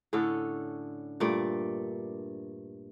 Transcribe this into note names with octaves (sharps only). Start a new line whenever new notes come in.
A2 D3 C#4 A4
G2 A#2 A3 D5